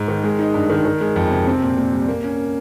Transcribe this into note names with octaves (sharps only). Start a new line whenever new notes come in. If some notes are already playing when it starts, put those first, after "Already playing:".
Already playing: G#2
D#3
G#3
D#4
G2
D#3
D#3
G#3
F2
C3
C4
A#2
A#2
G3
A#3
C#4